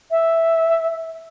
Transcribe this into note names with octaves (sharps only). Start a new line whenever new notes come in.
E5